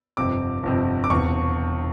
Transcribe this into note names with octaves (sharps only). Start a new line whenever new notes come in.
G1 F2 C3 D6
G1 F2 C3
D6
E1 E2 C3 C#6